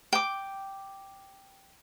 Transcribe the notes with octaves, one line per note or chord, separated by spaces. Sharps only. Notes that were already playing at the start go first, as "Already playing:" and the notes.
G5 D6